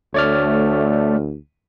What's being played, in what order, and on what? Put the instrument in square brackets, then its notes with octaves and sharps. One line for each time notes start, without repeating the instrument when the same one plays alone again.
[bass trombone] D2 [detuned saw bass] A3 [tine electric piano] C#5 D5 F6